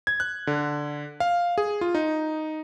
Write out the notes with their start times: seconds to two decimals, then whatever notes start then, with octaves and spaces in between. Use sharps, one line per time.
0.07 G#6
0.20 F#6
0.47 D3
1.20 F5
1.58 G#4
1.81 F4
1.95 D#4